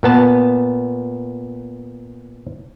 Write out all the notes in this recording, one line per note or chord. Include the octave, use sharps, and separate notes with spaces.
A#2 B3 A5